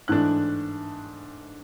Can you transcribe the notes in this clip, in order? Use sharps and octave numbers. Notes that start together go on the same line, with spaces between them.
G#2 E3 A3 D4 F#6